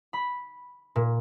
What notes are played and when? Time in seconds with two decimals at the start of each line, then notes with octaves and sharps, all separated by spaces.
0.13 B5
0.96 A#2